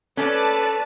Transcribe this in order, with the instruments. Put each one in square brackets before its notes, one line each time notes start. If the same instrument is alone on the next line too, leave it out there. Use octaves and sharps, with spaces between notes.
[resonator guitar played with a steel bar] C#4 [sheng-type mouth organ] A4 F#6 [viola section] B4 D5 A5